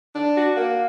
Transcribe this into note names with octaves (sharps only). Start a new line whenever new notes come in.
D4
F#4
A#3